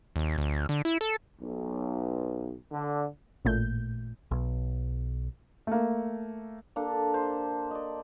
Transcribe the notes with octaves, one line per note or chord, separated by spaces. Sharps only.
D#2
D2
D3
E4
A4
B1
D3
A1 A#2 A3 G6
B1
A3 A#3
A#3 D4 G4 A4
C5
D5 D#5